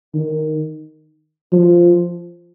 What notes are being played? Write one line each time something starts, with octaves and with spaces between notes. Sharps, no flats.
D#3
F3